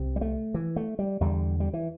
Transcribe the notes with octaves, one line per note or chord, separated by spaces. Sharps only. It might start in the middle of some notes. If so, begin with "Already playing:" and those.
Already playing: C2 C3
G3
A3
E3
A3
G3
E2 D3 G3
G3
E3